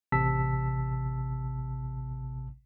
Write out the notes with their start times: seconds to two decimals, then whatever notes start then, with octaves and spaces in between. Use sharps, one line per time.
0.12 A1 C3 A5 E6 B6